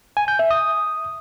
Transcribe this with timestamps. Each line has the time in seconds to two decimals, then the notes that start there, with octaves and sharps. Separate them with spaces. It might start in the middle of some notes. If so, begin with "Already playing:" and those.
0.17 G#5
0.28 G6
0.39 E5
0.51 D#6